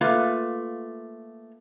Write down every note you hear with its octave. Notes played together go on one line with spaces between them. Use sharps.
A3 A#3 F4 B4